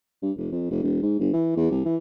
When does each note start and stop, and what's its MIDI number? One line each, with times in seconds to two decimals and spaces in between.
0.22 0.32 43
0.37 0.49 29
0.51 0.66 41
0.70 0.82 29
0.82 1.02 28
1.02 1.15 44
1.19 1.30 31
1.33 1.54 52
1.56 1.70 40
1.71 1.83 36
1.85 1.96 52